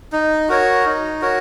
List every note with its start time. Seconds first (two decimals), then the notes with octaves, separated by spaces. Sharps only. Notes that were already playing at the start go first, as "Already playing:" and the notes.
0.12 D#4
0.49 F#4 A#4 C#5
0.85 D#4
1.22 F#4 A#4 C#5